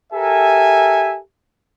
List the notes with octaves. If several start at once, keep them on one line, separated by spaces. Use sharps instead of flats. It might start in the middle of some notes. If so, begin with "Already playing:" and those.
G4 A4 A#4 E5 G#5